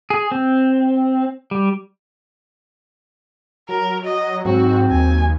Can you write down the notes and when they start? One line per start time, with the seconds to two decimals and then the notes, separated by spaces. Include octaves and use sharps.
0.10 G#4
0.32 C4
1.51 G3
3.69 F#3 A#4
4.04 D#5
4.45 G#2 F#3 C4 F#4
4.91 D#2 G#5